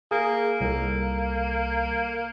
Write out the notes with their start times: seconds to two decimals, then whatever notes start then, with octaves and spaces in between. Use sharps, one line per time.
0.11 A#3 G#4
0.61 C2 A#3 A4